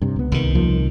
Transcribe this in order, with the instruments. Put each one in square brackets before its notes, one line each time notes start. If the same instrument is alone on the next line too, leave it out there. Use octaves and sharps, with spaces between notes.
[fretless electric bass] G2 C3
C#2 B3
[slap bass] C2 D#3
[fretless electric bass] D#2 F3 A#3